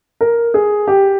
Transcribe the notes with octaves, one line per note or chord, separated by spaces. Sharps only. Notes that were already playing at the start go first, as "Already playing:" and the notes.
A#4
G#4
G4